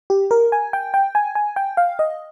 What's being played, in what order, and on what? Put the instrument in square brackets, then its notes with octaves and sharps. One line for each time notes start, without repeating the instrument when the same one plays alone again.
[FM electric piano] G4
A#4
G#5
G5
G5
G#5
G#5
G5
F5
D#5